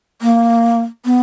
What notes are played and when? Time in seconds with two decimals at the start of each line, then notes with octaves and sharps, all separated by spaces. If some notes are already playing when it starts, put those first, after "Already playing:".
0.22 A#3
1.05 B3